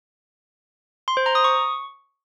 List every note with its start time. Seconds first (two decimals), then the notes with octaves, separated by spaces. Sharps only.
1.08 C6
1.17 C5
1.26 A#5
1.35 D#6
1.44 C#6